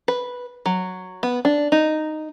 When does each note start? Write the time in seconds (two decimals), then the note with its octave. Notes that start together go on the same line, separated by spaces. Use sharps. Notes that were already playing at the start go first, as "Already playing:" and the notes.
0.08 B4
0.66 F#3
1.23 B3
1.45 D4
1.72 D#4